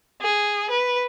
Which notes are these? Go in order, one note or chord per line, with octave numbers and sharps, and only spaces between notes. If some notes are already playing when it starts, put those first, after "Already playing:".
G#4
B4